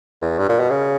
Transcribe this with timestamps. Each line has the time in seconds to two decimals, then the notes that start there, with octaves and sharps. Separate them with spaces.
0.22 E2
0.39 G2
0.49 A#2
0.60 B2
0.70 C#3